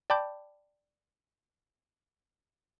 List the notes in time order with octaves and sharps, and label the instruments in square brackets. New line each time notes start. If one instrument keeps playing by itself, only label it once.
[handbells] D5 G5 A5 B5 D6 G6